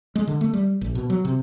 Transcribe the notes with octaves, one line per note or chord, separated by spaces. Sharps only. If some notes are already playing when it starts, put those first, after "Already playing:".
G#3
D3
A3
G3
A#1
B2
F#3
C3